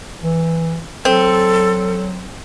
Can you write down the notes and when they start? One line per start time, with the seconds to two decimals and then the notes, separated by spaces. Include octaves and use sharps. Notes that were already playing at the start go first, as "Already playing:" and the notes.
0.22 E3
1.05 F#3 C4 A4